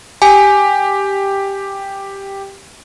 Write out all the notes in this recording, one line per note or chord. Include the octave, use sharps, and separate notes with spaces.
G4 G#5